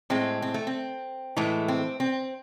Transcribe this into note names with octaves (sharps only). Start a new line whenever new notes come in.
A2 G#3 C4
C4
A3
C4
A2 E3 G#3 A3
C4
C4